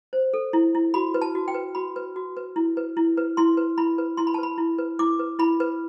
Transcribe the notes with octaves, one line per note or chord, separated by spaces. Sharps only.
C5
A4
E4
E4
F#4 B5
B4
A5
F#4
G5
B4
F#4 B5
B4
F#4
B4
E4
B4
E4
B4
E4 C6
B4
E4 B5
B4
E4 C6
B5
A5
B4 B5
E4
B4
E4 D6
B4
E4 B5
B4